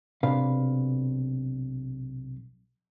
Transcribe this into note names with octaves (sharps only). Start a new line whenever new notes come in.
B1 C3 D4 B4 F5